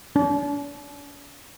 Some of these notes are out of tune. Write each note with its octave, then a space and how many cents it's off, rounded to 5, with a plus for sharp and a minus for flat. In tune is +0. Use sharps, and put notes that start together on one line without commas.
D4 -45